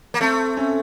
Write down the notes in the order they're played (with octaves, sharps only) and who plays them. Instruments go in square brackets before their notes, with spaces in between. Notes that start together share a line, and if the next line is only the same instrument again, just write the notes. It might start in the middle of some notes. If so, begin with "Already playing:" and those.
[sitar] A#3
[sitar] A3 [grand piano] C4
[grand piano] C#4